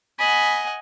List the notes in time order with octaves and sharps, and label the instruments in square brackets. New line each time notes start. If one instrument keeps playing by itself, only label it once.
[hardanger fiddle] D#5 F#5 [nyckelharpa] G#5 [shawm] B5